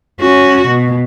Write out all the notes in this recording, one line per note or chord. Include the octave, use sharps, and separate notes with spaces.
C#4 F#4
B2